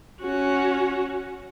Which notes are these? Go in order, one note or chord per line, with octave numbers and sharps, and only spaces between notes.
C#4 F#4